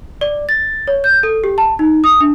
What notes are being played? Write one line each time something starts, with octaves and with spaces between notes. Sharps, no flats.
D5
A6
C#5
G6
A4
G4
A5
D#4
D#6
D4